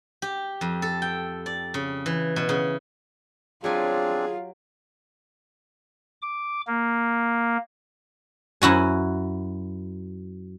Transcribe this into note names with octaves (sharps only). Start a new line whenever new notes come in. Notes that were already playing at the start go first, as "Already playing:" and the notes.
G4
F2
A4
G5
D5
C#3
E3
B2
C#3
F#3 C4 D4 F4 G4 G#4 G#5
D6
A#3
F#2 E4 F#4 G#5